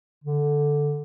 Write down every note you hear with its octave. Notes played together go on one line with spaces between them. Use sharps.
D3